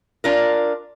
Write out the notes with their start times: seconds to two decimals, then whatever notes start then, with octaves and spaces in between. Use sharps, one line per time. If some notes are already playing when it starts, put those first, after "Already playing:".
0.24 D4 F4 A#4